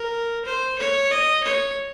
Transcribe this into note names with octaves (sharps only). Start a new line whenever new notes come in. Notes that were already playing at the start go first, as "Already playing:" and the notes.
Already playing: A#4
C5
C#5
D#5
C#5